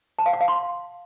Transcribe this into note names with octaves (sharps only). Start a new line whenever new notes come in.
A5
F5
F#5
F5
C6